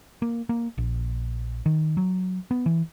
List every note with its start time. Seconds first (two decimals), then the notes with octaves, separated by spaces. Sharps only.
0.22 A#3
0.49 A#3
0.78 A#1
1.66 D#3
1.97 F#3
2.51 B3
2.66 E3